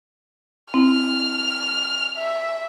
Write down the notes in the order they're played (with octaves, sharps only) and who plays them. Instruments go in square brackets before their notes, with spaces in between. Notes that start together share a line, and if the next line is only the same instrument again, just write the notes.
[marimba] C4 E4 [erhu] F6
[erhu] E5